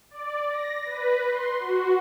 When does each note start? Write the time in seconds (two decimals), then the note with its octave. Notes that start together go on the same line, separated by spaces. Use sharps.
0.11 D5
0.50 A#6
0.85 B4
1.27 C6
1.59 F#4